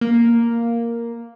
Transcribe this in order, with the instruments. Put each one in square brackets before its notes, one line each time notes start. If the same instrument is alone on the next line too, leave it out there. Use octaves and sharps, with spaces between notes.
[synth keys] A#3